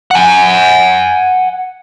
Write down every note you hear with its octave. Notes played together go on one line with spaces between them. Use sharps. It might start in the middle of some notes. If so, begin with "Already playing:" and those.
F#5 G#5